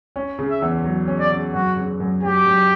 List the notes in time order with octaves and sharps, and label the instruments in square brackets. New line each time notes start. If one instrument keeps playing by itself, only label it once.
[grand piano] C#4
C#3
[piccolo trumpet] E5
[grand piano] E2
F#3
C#4
[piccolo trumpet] D5
[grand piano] C#3
[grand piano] F#2 [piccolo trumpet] F#4
[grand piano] C#3
F#2
[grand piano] F#3 [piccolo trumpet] G4
[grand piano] F#2